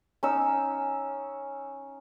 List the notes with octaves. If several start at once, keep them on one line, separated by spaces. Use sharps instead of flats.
C#4 D#4 E6